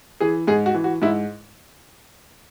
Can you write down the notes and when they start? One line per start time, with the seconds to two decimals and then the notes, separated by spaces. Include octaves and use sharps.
0.20 E3 G#4
0.47 G#2 G#4
0.66 F#4
0.74 E3
0.84 F#4
1.02 G#2 E4